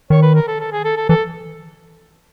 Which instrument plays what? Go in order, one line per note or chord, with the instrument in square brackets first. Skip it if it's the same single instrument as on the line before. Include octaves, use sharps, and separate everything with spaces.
[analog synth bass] D#3 [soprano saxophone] C#5
[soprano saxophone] B4
A#4
A4
A4
G#4
A4
A4
[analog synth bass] E3 [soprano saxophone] A4